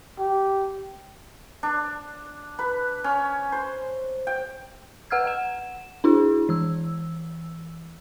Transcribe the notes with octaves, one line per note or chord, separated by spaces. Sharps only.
G4
D4
B4
C#4
C5
G5
B4 F#5 E6 F6 G#6
F#5 E7
D4 E4 G#4
E3 E6